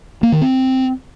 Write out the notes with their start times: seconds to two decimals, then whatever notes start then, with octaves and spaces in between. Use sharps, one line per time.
0.23 A#3
0.32 D#3
0.42 C4